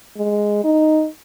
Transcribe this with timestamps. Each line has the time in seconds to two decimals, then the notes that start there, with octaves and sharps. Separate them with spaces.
0.17 G#3
0.64 D#4